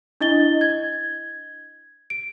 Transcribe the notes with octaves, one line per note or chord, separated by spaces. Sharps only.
D4 E4 D#5 A6 G7
G#6
D7